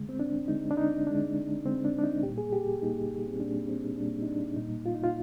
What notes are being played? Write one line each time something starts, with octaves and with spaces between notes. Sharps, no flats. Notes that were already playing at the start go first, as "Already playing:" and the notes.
Already playing: D3 G#3
C4
D4
D3 G#3 D#4
D4
D#4
D3 G#3 D4
D3 G#3 C4
D4
D4
D#4
A#2 G3 A#3 G4
G#4
G4
A#2 G3 A#3 D#4
C4
A#2 G3 A#3 D4
C4
A#2 G3 A#3 D4
D#4
D4
A#2 G3 A#3 D#4
F4
D#4
F4